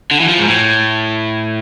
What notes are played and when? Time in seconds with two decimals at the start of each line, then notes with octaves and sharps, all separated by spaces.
0.11 D3
0.20 E3
0.28 F3
0.37 G#2
0.48 A2